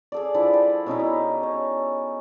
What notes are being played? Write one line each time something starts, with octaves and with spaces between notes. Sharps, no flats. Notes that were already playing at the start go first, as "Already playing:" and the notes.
G#4 A4 D5
F3 D4 E4
G5
B2 C#4 D#4 E4
D#4
C#5